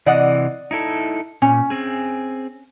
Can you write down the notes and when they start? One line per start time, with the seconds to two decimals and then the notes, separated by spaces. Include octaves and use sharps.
0.06 C3 E3 D5 D#5 F#5
0.71 D#4 E4 A4
1.42 A#2 C#4
1.70 C4 G#4